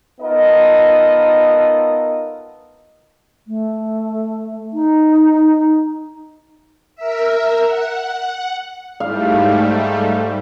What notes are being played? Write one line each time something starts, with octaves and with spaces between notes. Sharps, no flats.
B3 D#4 F4 A4 A#4 D#5
A3
D#4
A#4 E5
F#5
G#2 G3 A3 F5